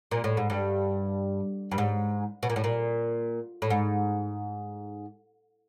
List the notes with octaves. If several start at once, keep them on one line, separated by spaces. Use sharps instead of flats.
A#2
A2
G#2
G2
G2
G#2
B2
A#2
A2
A#2
A2
G#2